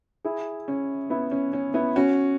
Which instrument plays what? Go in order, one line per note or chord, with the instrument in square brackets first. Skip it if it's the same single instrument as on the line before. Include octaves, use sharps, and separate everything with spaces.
[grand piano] E4 G#4
C#4
B3 E4
C#4
C#4
B3 E4
C#4 F#4